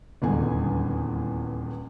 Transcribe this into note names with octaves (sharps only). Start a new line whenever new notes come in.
D#1 E2 G2 D3 G#3 G#5